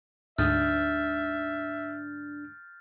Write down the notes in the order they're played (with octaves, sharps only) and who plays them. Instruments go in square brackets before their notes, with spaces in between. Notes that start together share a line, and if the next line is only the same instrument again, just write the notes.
[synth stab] D2 G#2 D#6 [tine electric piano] D4 [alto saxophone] E5 [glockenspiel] F6 G6 A6